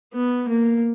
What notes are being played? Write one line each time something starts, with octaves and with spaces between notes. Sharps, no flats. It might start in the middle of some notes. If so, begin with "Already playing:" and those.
B3
A#3